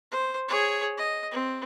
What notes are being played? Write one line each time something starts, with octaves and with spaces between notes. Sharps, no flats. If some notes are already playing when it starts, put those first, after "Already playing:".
C5
G#4 C#5
D#5
C4